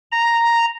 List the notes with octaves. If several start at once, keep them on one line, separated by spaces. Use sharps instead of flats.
A#5